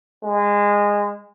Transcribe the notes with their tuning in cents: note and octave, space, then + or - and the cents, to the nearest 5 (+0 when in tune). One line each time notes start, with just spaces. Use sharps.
G#3 -20